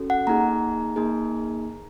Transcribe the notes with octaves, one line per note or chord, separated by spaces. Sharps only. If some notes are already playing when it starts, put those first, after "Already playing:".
Already playing: C#4 F#4 A4
F#5
A#3 D#4 G#4 A#5
A#3 D#4 G#4